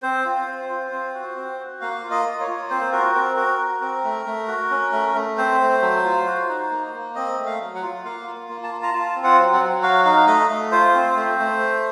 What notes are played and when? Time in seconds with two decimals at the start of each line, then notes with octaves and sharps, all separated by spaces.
0.03 C4 C5
0.25 F4
0.47 C4
0.69 F4
0.92 C4
1.14 F#4
1.36 C4
1.59 F#4
1.81 A#3 F5
2.03 F4
2.11 D#5
2.26 A#3
2.40 C#5
2.48 F4
2.70 C4 C5
2.93 F#4 A#4
3.15 C4 A#4
3.36 F#4 A#4
3.59 F#4
3.81 C4
4.04 A3
4.26 A3
4.48 F#4
4.70 C#4
4.92 A3
5.15 A3
5.38 C4 C5
5.60 A3
5.82 F#3
6.05 F4
6.27 F#4
6.49 D#4
6.71 A#3
6.93 A#3
7.15 C4 D#5
7.38 A3
7.46 F5
7.60 F#3
7.75 F#5
7.82 F4
8.05 A#3 F5
8.27 F4
8.49 A#3
8.64 A5
8.72 F4
8.83 A#5
8.94 F4 A5
9.16 C4
9.24 F#5
9.38 F#3
9.53 F#5
9.61 F#3
9.82 F#4 F5
10.05 D#4 F5
10.27 A3 D#5
10.50 A3
10.72 F4 C5
10.94 C4
11.16 A3
11.39 A3